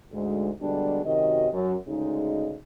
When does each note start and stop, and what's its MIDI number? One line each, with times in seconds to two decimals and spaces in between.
0.13 0.49 38
0.13 0.49 44
0.13 0.49 56
0.60 1.02 47
0.60 1.02 50
0.60 1.02 55
0.60 1.02 56
0.60 1.02 62
1.05 1.47 42
1.05 1.47 48
1.05 1.47 51
1.05 1.47 66
1.05 1.47 75
1.53 1.75 42
1.88 2.55 38
1.88 2.55 49
1.88 2.55 56
1.88 2.55 63